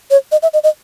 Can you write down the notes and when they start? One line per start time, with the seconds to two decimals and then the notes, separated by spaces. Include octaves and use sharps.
0.11 C#5
0.32 D#5
0.43 E5
0.54 D#5
0.64 D#5